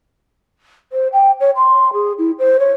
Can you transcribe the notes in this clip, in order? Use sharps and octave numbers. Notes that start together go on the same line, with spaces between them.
C5
G5
C#5
C6
G#4
E4
C5
C#5